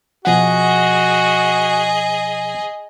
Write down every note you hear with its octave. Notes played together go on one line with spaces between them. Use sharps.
B2 F3 F#4 G#4 D#5 F#5